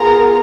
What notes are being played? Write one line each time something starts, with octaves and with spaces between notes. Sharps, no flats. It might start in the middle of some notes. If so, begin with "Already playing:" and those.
Already playing: B3 F4 G#4 A#4 A#5